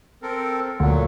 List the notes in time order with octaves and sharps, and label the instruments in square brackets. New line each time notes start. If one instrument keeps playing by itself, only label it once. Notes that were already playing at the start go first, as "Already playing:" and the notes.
[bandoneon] C4 A4 A#4
[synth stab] D2 [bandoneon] A#2 F#3